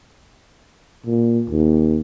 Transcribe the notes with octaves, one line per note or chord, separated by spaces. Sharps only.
A#2
D#2